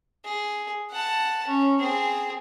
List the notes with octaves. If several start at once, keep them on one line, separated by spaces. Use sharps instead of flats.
G#4
F#5 A5
C#4
C4 G#4